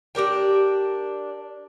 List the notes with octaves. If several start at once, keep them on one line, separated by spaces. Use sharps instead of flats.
D4 G4 A#4 G5